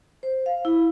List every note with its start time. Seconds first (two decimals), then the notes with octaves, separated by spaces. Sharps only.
0.23 C5
0.46 F5
0.65 E4